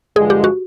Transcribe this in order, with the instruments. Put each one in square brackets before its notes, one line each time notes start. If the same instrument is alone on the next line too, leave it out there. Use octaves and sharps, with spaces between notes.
[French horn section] G2 D3 F3 G#3 [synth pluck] G#4
[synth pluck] G4
F#4